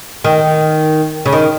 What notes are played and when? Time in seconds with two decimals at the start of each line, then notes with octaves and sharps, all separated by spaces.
0.25 D#3
1.26 C#3
1.33 D#3